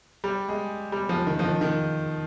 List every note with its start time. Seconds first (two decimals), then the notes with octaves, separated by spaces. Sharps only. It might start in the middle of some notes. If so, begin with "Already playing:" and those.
0.24 G3
0.49 G#3
0.92 G3
1.09 F3
1.27 D#3
1.39 F3
1.45 D#3
1.61 D#3